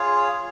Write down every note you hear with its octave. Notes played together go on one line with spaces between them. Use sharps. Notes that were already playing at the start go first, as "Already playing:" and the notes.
Already playing: F4 G#4 C#5 F5